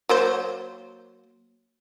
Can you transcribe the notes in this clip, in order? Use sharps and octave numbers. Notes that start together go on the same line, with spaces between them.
F#3 A#3 C5